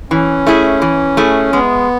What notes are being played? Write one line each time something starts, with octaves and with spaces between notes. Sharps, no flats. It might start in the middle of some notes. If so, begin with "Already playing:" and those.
E3 C#4
A3 E4 G#4
E3
A3 E4 G#4
G#3 B3